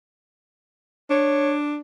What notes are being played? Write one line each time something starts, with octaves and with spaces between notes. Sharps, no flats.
D4 C#5